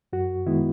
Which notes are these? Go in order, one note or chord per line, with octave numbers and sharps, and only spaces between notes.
F#2 F#4
D#3 G#3 B3 E4